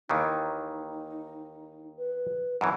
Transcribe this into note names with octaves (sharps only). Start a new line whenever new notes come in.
D#2 D#3 E3 D#4
B4
F#2 B2 E3 A#5